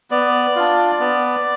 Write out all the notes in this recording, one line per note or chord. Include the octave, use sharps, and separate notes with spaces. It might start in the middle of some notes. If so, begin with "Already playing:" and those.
B3 D5
D4 F4
B3